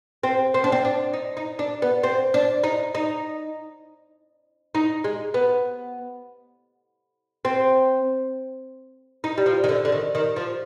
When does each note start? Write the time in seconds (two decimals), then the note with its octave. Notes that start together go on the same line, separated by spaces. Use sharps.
0.23 C4
0.54 C4
0.64 D4
0.72 C4
0.85 D4
1.13 D#4
1.37 D#4
1.59 D4
1.82 B3
2.03 C4
2.34 D4
2.64 D#4
2.95 D#4
4.75 D#4
5.04 G#3
5.34 B3
7.45 C4
9.24 D#4
9.38 G3
9.46 F3
9.64 D#3
9.69 D3
9.85 D3
9.92 D#3
10.15 D#3
10.36 F3